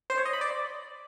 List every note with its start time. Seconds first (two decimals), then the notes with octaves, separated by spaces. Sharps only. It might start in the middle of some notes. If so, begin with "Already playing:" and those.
0.10 C5
0.18 C#5
0.25 D#5
0.33 B5
0.41 D5